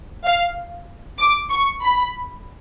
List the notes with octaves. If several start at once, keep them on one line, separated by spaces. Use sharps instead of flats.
F5
D6
C#6
B5